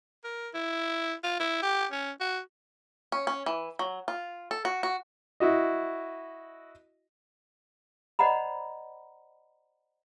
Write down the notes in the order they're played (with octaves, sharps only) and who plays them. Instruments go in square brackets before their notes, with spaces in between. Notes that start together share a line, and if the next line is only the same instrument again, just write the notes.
[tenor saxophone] A#4
E4
F4
E4
G4
C#4
F#4
[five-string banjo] C#4
C#4
E3
F#3
F4
A4
F#4
F#4
[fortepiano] E4 F#4 D#5
[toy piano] C5 D5 D#5 F#5 A#5 B5